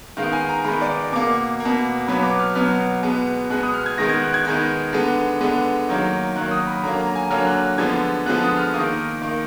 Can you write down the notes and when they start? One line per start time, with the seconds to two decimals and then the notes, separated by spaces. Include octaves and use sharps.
0.17 D#3 G#3 B3 F5
0.33 G#5
0.49 A#5
0.64 D#3 G#3 B3 B5
0.81 D5
1.12 B2 A#3 D6
1.60 A#3
1.65 B2
2.07 B2 F#3 B3 B5
2.23 D6
2.39 F6
2.55 B2 F#3 B3 F6
3.03 B2 G#3 B3
3.50 B2 G#3 B3 F#6
3.63 D#6
3.74 F6
3.86 G#6
3.98 D#3 G#3 B3 A#6
4.09 G#6
4.22 F#6
4.34 G#6
4.45 D#3 G#3 B3 G#6
4.93 D3 G#3 B3
5.41 D3 G#3 B3
5.89 D#3 F#3 A#3
6.36 D#3 F#3 A#3 F#6
6.51 D#6
6.67 B5
6.84 D3 F#3 A#3 A#5
6.99 A#5
7.16 G#5
7.30 D3 F#3 A#3 F6
7.47 F#6
7.78 D3 F3 G#3 B3 G#6
8.26 D3 F3 G#3 B3 F#6
8.42 D#6
8.57 F6
8.74 D#3 A#3 D#6
9.22 D#3 A#3